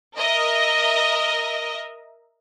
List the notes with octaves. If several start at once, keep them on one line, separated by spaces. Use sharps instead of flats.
A#4 D#5 E5